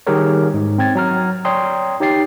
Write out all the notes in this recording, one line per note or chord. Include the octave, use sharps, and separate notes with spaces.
D#3 G3 G4 G#4 A#4 C#5
G#2
C4 G5 G#6 A6
F#3 A#5 F6
C#5 D5 G5 A#5 C6 D#6
D#4 G4 C#5 G5 A6 C7